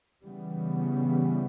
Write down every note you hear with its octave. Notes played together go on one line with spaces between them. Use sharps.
C#3 E3 G3 B3